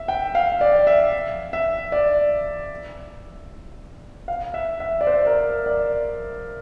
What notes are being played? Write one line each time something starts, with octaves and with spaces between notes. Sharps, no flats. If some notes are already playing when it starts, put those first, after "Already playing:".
Already playing: E5
G5
F5
D5
E5
E5
D5
F5
E5
E5
D5
C5
A#4
D5